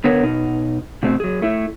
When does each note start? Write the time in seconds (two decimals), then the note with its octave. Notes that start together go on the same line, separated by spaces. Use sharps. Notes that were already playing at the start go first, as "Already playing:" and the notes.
0.04 D3 B3 A#4 B4 C#5
0.23 B2 D#4
1.03 B2 A3 C4 F#4
1.20 F#3 G#4
1.42 A3 E4